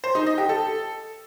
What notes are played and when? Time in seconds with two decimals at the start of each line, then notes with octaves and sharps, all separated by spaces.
0.04 C5
0.15 D#4
0.26 D#5
0.38 G4
0.49 A4